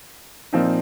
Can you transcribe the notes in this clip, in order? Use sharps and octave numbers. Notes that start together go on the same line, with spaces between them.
A#2 F3 C4 D#4